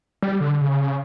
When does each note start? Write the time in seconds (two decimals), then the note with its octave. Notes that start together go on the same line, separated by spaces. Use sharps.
0.22 G3
0.41 D3
0.61 C#3
0.83 C#3